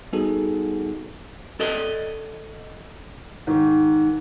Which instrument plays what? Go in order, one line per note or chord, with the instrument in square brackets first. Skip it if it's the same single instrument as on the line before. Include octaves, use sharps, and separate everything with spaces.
[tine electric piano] G3 B3 D#4 F#4 G#4 A4
[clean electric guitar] A4 D5 D#5
[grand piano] G#2 D#3